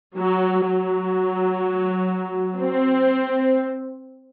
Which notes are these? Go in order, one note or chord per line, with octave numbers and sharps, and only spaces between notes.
F#3
F#3
C4